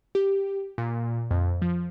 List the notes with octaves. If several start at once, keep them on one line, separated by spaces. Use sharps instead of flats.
G4
A#2
F2
F3